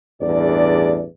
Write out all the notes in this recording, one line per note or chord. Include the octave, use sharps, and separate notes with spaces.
A1 E2 G2 D4 G#4 D5